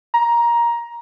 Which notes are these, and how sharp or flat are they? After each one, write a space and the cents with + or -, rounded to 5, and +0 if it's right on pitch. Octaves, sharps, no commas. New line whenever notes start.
A#5 +15